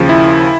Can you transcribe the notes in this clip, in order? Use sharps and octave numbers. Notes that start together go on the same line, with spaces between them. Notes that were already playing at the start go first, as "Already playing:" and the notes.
Already playing: D#2 C#3 F3
E4